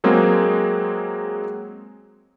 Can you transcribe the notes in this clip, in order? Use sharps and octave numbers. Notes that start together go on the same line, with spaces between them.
F#3 G#3 A#3 C4 G#4